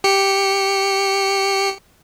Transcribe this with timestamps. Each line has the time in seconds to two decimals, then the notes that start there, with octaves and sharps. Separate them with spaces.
0.04 G4 C#7